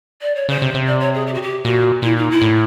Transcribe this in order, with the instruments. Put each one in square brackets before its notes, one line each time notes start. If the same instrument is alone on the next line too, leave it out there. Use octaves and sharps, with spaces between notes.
[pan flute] D5
C#5
[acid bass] C#3 [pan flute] C5
[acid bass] C3
C3
[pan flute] D5
C#5
G#4
G4
F#4
G4
[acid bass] A#2 [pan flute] F#4
[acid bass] A#2 [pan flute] E4
[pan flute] D#4
E4
[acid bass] A2